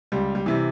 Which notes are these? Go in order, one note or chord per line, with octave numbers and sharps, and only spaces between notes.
C#2 G3
G3
C3 E3